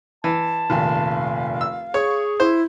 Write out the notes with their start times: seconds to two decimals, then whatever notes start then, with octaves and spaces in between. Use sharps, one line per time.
0.24 E3 A5
0.70 F1 A#1 D#2 F5
1.61 E6
1.94 G#4 C#5 C#6
2.40 E4 C5